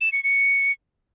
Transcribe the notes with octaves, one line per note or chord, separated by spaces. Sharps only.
E7
C#7
C#7